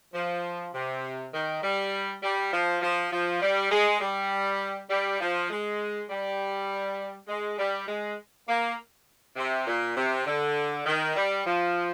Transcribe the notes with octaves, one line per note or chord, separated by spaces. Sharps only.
F3
C3
D#3
G3
G3
F3
F3
F3
G3
G#3
G3
G3
F3
G#3
G3
G#3
G3
G#3
A#3
C3
A#2
C3
D3
D#3
G3
F3